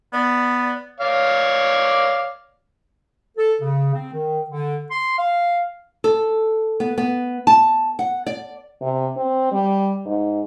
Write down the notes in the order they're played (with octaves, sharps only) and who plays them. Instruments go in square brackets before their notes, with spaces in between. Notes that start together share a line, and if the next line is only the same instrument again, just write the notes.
[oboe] B3 [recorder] D5
[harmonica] C#5 D5 F5
[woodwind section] A4
C#3
C4
D#3
D3
C6
F5
[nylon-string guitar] A4
B3
B3
A5
F#5
D5
[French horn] C3
C4
G3
G#2